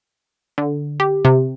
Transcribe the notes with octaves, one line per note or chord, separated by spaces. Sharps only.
D3
G4
C3